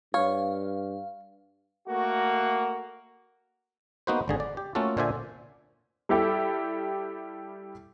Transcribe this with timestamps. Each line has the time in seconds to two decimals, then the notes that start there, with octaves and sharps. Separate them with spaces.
0.14 G2 C#5 F5
1.88 A3 A#3 F#4
4.07 A#3 B3 D#4 F#4 B4 C5
4.28 G#1 D3 G#4
4.40 D5
4.57 G4
4.75 A3 A#3 C#4 F4 F#4 A4
4.97 A#2 D3 C5 D5 E5 G#5
6.09 G3 E4 G4 A4